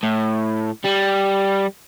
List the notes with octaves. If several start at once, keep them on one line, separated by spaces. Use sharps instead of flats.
A2
G3